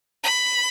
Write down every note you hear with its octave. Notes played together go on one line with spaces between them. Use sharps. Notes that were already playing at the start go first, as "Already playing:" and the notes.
B5